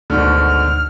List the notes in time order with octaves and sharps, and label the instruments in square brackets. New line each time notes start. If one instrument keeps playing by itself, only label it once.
[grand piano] G#1 B2 D3 [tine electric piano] D2 [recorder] F6